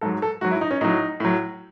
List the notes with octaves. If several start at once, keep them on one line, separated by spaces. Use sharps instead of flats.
G#2 F#3 A4
A4
G#2 F#3 F#4
E4
D#4
C#4
A2 F#3 D#4
A2 F#3